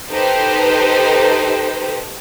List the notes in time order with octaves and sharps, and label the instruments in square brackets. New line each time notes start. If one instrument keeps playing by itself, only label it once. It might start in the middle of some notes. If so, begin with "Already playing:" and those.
[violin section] D#4 G4 A4 B4 C5